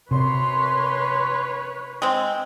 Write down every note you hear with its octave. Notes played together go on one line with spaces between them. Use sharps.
F#2 C3 B4 C#5 C6
G#3 C4